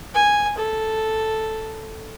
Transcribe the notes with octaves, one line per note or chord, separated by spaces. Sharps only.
G#5
A4